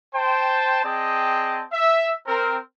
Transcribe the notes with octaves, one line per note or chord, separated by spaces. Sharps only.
C5 G5 A5
C4 G#4 D5 D#5 G5 A5
E5
C4 A#4